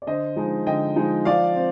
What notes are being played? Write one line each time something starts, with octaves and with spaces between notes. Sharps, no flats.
D5
D3 C5 D#5
F3 G#3 D#4
D3 D#5 G5
F3 G#3 D#4
F3 D5 F5
C4